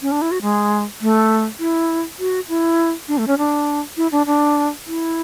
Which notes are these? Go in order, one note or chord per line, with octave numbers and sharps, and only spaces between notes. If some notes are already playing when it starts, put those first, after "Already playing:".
C#4
D4
E4
F#4
G#3
A3
E4
F#4
E4
D4
A3
C#4
D4
E4
D4
D4
E4